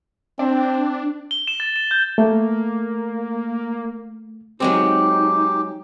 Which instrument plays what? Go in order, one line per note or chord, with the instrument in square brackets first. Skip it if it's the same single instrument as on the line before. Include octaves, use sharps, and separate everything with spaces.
[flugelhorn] C4 [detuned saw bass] D4
[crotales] G7
E7
A6
E7
G6
[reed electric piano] A3 [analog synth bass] A#3
[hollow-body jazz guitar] F#3 G#3 C4 [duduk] D#4 [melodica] G4